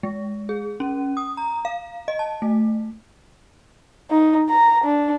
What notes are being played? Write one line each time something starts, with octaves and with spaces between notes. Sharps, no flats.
G#3
G#4
C#4
D#6
A#5
F5
D#5
A5
A3
D#4
A#5
D4